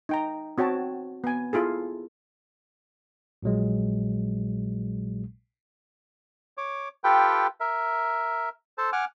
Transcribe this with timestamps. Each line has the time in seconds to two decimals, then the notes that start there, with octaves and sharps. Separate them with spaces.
0.09 D#4 G5 A#5
0.58 C4 F#4 C#5 G5 A5
1.24 B3 G#5
1.53 E4 F4 G#4 A4
3.43 A#1 A#2 F#3 G#3
6.57 C#5 D6
7.04 F4 G4 A4 B4 G5
7.60 A#4 E5
8.78 A4 C5 A5
8.93 F#5 G#5 D6 F6